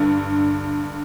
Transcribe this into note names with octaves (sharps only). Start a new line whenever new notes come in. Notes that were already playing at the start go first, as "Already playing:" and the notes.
Already playing: G2 D3